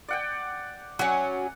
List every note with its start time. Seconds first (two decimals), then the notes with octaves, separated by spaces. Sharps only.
0.09 D5 F#5 G5
0.99 F#3 C#4 F#5